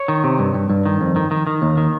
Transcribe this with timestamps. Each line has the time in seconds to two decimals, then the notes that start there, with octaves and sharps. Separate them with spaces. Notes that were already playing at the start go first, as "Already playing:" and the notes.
Already playing: C#5
0.08 D#3
0.24 C3
0.39 G2
0.54 G2
0.70 G2
0.86 D#3
1.01 F2
1.16 D#3
1.31 D#3
1.47 D#3
1.62 D#2
1.77 D#3